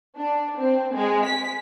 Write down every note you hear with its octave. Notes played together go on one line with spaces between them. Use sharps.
D4
C4
G#3
B6